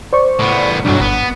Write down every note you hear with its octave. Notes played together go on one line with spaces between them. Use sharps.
C5 D5 C#6
A2 B3
B1 G2 F#3 D4
G#1 B3